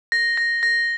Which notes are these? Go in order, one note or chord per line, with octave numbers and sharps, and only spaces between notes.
A#6
A#6
A#6